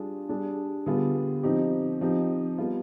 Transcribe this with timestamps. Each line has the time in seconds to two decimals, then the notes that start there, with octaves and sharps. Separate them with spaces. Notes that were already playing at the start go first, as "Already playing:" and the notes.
Already playing: G3 D4 F4 G#4
0.29 G3 D4 G#4
0.86 D3 G3 B3 F4 G#4
1.43 F3 C4 D#4 G4
2.01 F3 C4 D#4 G4
2.58 G3 B3 F4